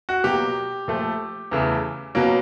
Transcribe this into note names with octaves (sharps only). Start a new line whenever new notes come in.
F#4
B2 F#3 A#3 G4
A#2 F3 A3
E2 C#3 E3 A3
B2 F#3 A#3 C#4